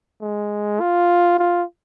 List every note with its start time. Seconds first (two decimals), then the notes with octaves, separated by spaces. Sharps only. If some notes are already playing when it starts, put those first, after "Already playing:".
0.21 G#3
0.80 F4
1.39 F4